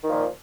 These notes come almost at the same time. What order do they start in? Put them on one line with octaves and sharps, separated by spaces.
D#3 F3 A#2